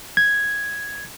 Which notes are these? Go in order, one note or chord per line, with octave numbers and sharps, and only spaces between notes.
G#6